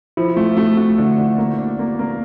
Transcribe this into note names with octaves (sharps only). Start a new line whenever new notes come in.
F3 E4
A3 F4
A3 F#4
A3 F#4
D3
D3
A#3
D4
A#3
A#3